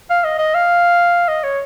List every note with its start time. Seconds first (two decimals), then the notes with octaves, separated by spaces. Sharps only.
0.10 F5
0.24 D#5
0.39 D#5
0.54 F5
1.28 D#5
1.44 C#5